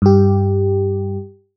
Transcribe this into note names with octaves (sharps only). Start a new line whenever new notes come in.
G2 G4